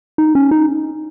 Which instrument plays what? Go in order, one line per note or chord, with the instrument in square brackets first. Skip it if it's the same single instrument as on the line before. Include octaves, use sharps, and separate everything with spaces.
[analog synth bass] D#4
C#4
D#4